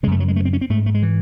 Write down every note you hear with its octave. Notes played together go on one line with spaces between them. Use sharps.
F#2 C#3 G#3 A3
F#3
G#3
A3
C4
C#4
C4
G#2 A3
A3
G#3
E3